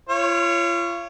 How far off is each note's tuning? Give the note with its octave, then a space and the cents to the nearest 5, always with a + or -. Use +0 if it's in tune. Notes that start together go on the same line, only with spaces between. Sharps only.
F4 -35 C#5 +0